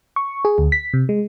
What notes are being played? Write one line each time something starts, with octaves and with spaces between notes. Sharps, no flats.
C#6
G#4
D2
B6
C3
G#3